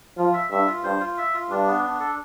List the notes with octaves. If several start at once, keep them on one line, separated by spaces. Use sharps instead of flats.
F3 F4
E5
G2 E5
F4
G2 C5
F4
E5
F4
G2 D4
B3
D4
A4